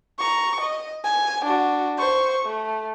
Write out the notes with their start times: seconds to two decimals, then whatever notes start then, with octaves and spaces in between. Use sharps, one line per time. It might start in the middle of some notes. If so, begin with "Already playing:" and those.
0.19 A#5 C#6
0.61 D#5
1.04 G#5
1.45 D4 F#4
1.99 C5 C#6
2.46 A3